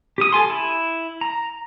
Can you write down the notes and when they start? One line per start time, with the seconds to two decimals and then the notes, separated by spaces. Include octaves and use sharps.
0.18 G4 D#6
0.32 A4 G#5 C6
0.50 E4
1.21 A#5